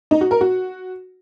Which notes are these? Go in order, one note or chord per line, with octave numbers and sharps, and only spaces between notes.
D#4
F#4
A#4
F#4